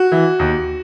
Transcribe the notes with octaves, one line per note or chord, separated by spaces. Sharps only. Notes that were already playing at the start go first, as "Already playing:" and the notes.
Already playing: F#4
E3
D#2